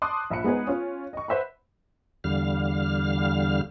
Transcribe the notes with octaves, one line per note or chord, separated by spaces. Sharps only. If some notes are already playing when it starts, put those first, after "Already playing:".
A5 C6 D6 D#6 F#6
A#1 E5 B5 C#7
G#3 B3 D#4 G#4 B4
C#4 F4
D#5 C#6
B4 C5 E5 F#5 B5
E2 D3 G3 F5 F6